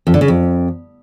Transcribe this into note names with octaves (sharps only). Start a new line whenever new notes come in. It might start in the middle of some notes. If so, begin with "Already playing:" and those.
F2
D3
C#3
F2